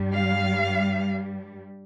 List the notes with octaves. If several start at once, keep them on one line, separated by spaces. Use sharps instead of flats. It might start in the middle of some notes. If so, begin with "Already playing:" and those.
Already playing: G2 G3
F5